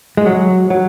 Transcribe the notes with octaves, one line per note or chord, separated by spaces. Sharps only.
G#3
F#3
F#3